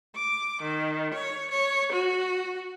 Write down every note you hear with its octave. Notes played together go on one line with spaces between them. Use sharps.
D6
D#3
C#5
C#5
F#4